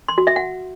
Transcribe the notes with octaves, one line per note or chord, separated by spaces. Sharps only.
C6
F#4
E5
F#5